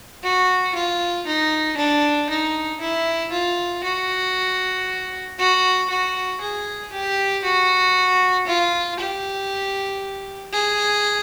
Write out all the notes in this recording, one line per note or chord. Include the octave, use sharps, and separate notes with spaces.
F#4
F4
D#4
D4
D#4
E4
F4
F#4
F#4
F#4
G#4
G4
F#4
F4
G4
G#4